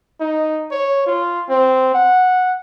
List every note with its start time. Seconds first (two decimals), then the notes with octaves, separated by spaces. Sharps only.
0.20 D#4
0.71 C#5
1.07 F4
1.48 C4
1.94 F#5